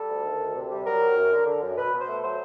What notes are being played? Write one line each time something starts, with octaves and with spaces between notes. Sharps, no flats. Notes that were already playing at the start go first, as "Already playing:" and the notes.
Already playing: G3 A4
D2
D#3
D2
C3
G3
F#3 A#4
F#3
F#2
D3
D3
F#2
B2 B4
B2
C5
A3
F#3 C5